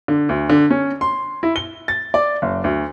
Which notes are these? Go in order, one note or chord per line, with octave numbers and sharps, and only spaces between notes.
D3
D2
D3
C#4
C6
E4
G7
A6
D5
F#1
D2